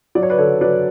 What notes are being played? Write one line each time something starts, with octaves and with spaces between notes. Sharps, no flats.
F#3 D5
C#5
B4 D5
D3 A4 C#5
F#3 B4 D5